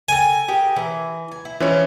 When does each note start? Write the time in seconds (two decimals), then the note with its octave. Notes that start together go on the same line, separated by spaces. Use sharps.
0.09 A4 A#4 G5 G#5
0.48 G4 G#4 A#4
0.76 E3 A#5
1.32 G#5
1.45 E4
1.60 E3 F3 G#3 C#4 C#5